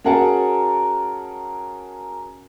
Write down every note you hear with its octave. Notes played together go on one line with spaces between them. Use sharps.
C#4 F#4 G#4 A#4 F#5 A5